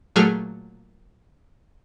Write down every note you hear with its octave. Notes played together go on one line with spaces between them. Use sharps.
A#2 F#3 A3 G#4 F6